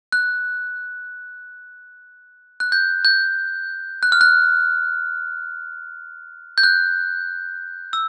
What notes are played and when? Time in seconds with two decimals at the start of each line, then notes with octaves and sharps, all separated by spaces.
0.12 F#6
2.60 F#6
2.72 G6
3.05 G6
4.03 F#6
4.12 F6
4.21 F#6
6.58 G6
6.63 F#6
7.93 E6